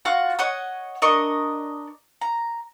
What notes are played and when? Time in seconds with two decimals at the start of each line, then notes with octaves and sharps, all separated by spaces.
0.05 F4 F#4 F#5
0.39 C#5 D#5 F#5 D#6
1.02 D4 A#4 D#5 C#6
2.21 A#5